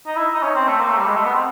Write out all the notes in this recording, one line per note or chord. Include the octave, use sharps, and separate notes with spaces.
D#4
E4
D#4
C#4
C4
A3
A#3
A3
G3
G#3
A3
B3
C4